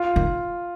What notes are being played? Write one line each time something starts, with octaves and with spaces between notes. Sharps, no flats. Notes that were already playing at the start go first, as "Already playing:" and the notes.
Already playing: F4
D#3